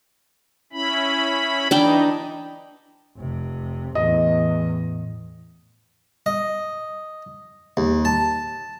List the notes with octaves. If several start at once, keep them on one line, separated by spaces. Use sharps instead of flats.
C#4 E4 B5
E3 D4 D#4 G5 B5
F1 C3
E2 A2 D#5
D#5
D#2
A5